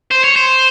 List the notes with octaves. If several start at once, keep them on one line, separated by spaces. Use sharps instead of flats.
C5
C#5
C5